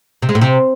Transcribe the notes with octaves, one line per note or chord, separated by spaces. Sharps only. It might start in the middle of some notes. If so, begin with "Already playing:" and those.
C3
G#3
A2
C3